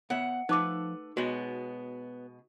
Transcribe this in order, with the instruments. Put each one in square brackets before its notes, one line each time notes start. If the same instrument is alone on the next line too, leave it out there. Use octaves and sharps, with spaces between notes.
[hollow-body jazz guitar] B3 C#5 E5 [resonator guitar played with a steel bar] F#5
[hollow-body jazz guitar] F3 [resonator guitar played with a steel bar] A3 B4 [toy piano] D#4 D6
[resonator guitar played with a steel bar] B2 G#3 [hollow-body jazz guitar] B3 C#5 [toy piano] F#4